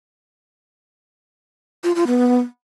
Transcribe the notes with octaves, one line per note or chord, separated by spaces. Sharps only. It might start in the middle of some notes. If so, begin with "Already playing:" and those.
F4
F4
B3